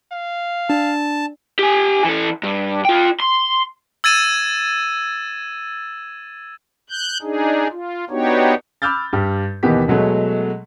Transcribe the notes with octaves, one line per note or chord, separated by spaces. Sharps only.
F5
D4 A5
G4 G#5
E3 A4
G2
F4 G5
C6
E6 G#6 A6 D#7 E7
F#6 G6
D4 D#4 G#4
F4
B3 D4 D#4 F#4 G4 C#5
B5 D6 E6 F6 G6 A6
G2 G4 F6
D#2 B2 E3 B3 G4 B6
B2 F#3 G#3 A3